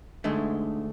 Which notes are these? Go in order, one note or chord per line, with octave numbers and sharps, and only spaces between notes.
D2 D3 G#3 A3 D#4 C6